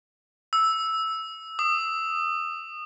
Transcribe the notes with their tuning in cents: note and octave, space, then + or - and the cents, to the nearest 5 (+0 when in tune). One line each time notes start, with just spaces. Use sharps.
E6 -5
D#6 -20